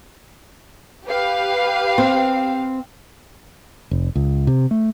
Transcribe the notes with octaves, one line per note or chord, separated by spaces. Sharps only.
G4 B4 F5
C4
F1
C#2
C3
A3